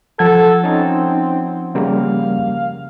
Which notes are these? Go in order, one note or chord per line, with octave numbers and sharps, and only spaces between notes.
F3 A4 F#5 G#6
C4 C#4 D#4
C#3 G3 A#3 F5